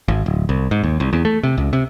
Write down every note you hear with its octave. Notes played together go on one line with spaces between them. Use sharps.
G#1
D1
C2
G#2
D#2
C2
E2
A3
C3
C#2
C3